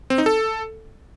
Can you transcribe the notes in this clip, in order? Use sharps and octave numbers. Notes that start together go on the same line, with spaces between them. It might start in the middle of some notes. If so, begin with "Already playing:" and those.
C4
D#4
A4